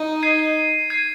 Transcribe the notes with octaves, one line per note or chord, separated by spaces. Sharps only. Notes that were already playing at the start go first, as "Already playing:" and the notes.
Already playing: D#4
G#6 C7 D#7
G#6 C7 D#7